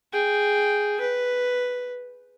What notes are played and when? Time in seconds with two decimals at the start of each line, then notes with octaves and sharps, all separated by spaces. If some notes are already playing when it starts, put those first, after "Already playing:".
0.12 G#4 G5
1.00 B4